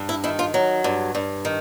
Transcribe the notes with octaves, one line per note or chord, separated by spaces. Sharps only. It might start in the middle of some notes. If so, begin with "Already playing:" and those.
Already playing: G2
E4
D#3 E4
F4
F#3
G2
G2
D#3